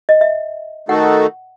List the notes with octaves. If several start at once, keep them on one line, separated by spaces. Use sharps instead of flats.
D#5
E5
D#3 A3 D#4 F#4 A4 F#5